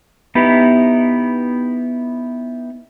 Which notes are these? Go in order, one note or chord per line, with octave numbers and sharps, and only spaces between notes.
B3 D#4 E4 G4 B4